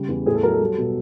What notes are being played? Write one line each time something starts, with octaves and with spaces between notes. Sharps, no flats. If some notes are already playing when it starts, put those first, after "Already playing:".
Already playing: C#3 G3
E2
A2 G#4
A4
F#3 A#4
A4
G3
B2